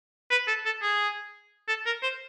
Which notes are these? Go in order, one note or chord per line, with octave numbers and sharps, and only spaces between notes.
B4
A4
A4
G#4
A4
A#4
C5